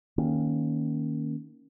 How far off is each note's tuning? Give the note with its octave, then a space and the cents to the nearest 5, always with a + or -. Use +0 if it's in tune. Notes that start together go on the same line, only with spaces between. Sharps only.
D#3 +0 A#3 +0 C#4 +0